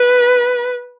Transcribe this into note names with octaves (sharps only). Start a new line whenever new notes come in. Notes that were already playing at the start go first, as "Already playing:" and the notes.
Already playing: B4